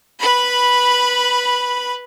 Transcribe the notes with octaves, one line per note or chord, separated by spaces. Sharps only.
B4 B5